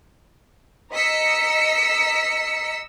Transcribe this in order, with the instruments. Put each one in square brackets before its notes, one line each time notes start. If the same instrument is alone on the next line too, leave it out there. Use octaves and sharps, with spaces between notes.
[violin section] D#5 A#5 E6 B6 C#7